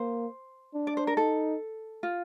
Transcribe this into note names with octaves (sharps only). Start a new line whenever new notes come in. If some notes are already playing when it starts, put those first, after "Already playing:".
Already playing: A#3 C5
D4
D5
C5
A#4
D#4 A4
F4